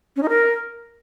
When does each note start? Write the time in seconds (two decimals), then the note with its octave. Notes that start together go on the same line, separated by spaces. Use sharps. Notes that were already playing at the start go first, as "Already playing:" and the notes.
0.16 C#4
0.23 D#4
0.29 A#4